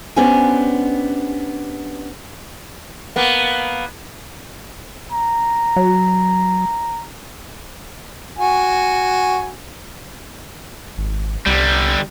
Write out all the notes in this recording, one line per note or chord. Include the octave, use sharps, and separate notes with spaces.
B3 C#4 D4 G4 C5 G#5
A#3 B3
A#5
F#3
F#4 G#5
G#1
C2 D3 G3